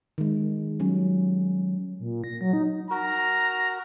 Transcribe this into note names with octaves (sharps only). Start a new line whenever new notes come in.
D#3 G#3
F#3 G3 C#4
A#2
A#6
F#3
D#4
F#4 A#4 A#5